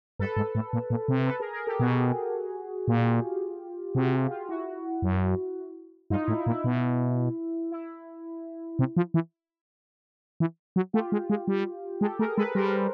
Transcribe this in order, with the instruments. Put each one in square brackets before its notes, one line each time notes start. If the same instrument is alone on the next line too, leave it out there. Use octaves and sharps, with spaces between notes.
[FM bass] G2 [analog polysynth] A4 B4
[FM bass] G#2
A2
A#2
A#2
C3
[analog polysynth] A4 B4
G#4 A#4
G#4 A#4
G4 A4
[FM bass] B2 [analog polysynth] F#4 G#4
[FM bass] A#2 [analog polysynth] F4 G4
[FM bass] C3 [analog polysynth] F#4 G#4
[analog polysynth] F4 G4
F4 G4
E4 F#4
[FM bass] F#2
[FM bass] G2 [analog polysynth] D#4 F4
[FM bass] A2 [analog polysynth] E4
[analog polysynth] E4
[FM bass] A#2
[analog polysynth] E4
[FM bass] B2
[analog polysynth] E4
[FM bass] C3
F3
E3
E3
F#3
[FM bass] A3 [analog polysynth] F4 G4
[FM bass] G#3
G#3
G3
[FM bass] G#3 [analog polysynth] G4 A4
[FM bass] A3 [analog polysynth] G#4 A#4
[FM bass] G#3 [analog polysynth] A4 B4
[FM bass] G3 [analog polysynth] A#4 C5